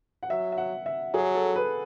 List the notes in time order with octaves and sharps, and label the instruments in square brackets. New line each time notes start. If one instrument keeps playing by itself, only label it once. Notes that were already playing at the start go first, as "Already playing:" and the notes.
[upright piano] F#5
[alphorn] F#3 [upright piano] E5
[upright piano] E5
F#5
E5
[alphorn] F#3 [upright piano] G#4
[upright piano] A4
B4